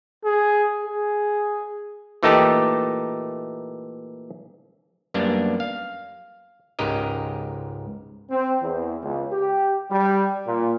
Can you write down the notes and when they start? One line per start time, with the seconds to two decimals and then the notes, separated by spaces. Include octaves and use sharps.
0.25 G#4
0.85 G#4
2.23 A#2 E3 A3 D#4 G4 A5
5.14 F#2 G3 A#3 B3 D4
5.60 F5
6.79 C#2 G#2 G4 A#4 D#5
8.30 C4
8.61 E2
9.02 C#2
9.31 G4
9.91 G3
10.46 A#2